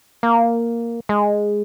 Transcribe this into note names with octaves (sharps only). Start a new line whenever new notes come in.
A#3
G#3